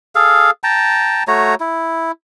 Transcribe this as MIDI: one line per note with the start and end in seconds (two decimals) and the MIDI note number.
0.15 0.51 68
0.15 0.51 69
0.15 0.51 77
0.64 1.24 79
0.64 1.24 81
0.64 1.24 82
1.28 1.55 57
1.28 1.55 66
1.28 1.55 73
1.28 1.55 82
1.60 2.12 64